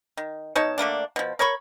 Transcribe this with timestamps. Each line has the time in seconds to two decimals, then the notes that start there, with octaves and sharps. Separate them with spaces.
0.17 D#3
0.55 B2 D#4 C#5 A5
0.78 D3 A3 A#3 D4
1.16 B2 F3
1.39 A#4 C#5 B5 C#6